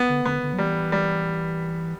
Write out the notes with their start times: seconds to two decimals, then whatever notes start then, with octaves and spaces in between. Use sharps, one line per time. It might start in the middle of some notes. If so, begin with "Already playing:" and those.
Already playing: B3
0.09 D3
0.26 D3 B3
0.43 D3
0.53 F#3
0.58 E3 G3
0.92 G3